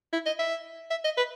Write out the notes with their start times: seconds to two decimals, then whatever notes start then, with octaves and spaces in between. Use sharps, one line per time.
0.13 E4
0.26 D#5
0.39 E5
0.91 E5
1.04 D#5
1.17 B4